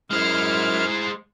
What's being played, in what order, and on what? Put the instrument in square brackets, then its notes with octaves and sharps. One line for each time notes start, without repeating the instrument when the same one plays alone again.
[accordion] F#2 F6 [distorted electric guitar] G#3 C5 [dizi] E4